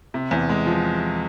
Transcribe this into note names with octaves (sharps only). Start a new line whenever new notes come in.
C3
E2
G#3
F3